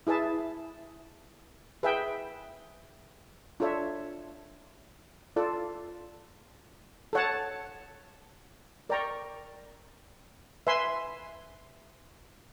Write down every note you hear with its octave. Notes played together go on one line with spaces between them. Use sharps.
E4 G#4 B4 E5 A5
G#4 B4 E5 G5
D4 F4 A4 C#5 E5
F4 A4 D5
A4 C#5 F#5 A5
A#4 D5 G5 A#5 C#6
B4 E5 G#5 C6